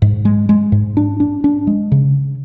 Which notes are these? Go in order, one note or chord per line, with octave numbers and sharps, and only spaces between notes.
G#2
G#3
G#3
G#2
D4
D4
D4
G#3
C#3